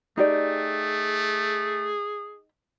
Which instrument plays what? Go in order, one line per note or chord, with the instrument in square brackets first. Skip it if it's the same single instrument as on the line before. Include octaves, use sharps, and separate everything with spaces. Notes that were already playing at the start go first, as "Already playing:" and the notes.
[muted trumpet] A3 [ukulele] D#4 G4 D5 [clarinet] G#4